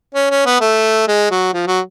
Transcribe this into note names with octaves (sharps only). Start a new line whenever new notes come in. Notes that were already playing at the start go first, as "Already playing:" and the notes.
C#4
C#4
B3
A3
G#3
F#3
F3
F#3